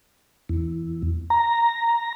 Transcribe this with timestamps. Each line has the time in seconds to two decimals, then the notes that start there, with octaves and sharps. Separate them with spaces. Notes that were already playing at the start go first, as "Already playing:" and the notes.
0.49 E2
1.30 A#5